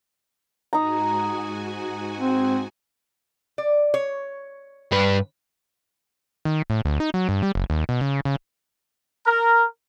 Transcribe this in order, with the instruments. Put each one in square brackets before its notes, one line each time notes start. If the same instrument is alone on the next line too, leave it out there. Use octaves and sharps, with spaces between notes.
[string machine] G#2 F#4 G#5 [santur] D#4 A#5
[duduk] C4
[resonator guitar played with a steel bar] D5
C#5
[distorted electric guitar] G2 B4
[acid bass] D#3
A2
D2
D#4
F#3
G2
G3
F#1
D#2
B2
C#3
C#3
[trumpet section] A#4